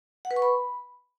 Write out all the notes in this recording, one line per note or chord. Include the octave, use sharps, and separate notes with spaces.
F#5
B4
C#6
B5